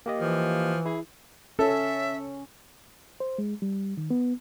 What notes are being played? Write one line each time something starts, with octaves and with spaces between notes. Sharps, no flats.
A#3 G4 D#5
E3 F3
E4 G#4
C#4 A4 E5
C5
G#3
G3
D#3
B3